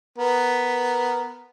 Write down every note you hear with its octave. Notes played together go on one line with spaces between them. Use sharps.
B3 A#4